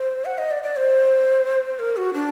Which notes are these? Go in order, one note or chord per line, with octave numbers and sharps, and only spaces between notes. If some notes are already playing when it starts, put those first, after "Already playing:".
Already playing: C5
F#5
D#5
D5
D5
C5
A#4
F#4
D4